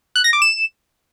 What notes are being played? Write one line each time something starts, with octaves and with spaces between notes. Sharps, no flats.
F#6
A#6
D6
E7